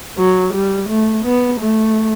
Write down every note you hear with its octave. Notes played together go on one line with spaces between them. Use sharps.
F#3
G3
A3
B3
A3